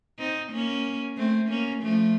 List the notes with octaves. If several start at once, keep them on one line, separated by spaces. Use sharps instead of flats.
C4 D#4
A#3 C#4
A3 C4
A#3 C#4
F3 A3